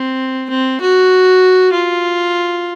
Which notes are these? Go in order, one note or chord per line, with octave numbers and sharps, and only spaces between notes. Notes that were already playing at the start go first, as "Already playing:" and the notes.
Already playing: C4
C4
F#4
F4